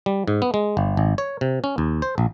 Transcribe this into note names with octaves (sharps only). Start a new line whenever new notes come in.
G3
G#2
B3
G#3
G1
G#1
C#5
C3
C#4
D#2
C5
A#1